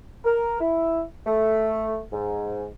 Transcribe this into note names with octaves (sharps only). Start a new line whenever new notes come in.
A#4
E4
A3
G#2